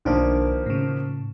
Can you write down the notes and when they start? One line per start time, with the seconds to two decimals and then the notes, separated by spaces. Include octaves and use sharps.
0.05 B1 D#3 F3 A#3 D4
0.66 A2 C#3